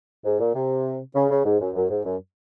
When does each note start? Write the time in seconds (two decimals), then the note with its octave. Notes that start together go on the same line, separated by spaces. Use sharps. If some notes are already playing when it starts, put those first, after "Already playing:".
0.25 G#2
0.40 A#2
0.55 C3
1.15 C#3
1.30 C#3
1.45 G#2
1.60 F#2
1.74 F#2
1.89 G#2
2.05 F#2